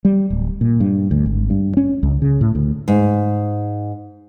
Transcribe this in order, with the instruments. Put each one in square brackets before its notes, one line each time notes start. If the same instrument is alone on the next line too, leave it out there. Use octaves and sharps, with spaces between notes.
[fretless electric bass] G3
D1
A#2
G2
D2
G#1
G2
C#4
C#2
C#3
A2
D2
[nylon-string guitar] G#2